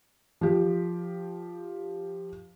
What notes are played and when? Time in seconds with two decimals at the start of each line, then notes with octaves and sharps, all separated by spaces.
0.41 F3 G4